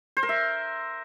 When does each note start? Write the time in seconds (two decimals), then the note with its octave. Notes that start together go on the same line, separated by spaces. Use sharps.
0.17 C5
0.23 A#4
0.29 E5